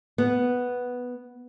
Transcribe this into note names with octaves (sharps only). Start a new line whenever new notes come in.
B3